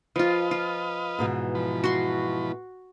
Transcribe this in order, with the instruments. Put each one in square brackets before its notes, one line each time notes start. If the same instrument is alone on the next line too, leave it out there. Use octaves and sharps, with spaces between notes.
[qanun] F3 F4 [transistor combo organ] B4 D#5 F5
[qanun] F4
[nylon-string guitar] G#2 B2 E3
[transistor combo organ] F3 B5
[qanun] F#4 C6